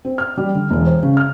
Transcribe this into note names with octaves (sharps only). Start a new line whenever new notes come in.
C4
F6
G3
D3
E1
C5
C#3
F6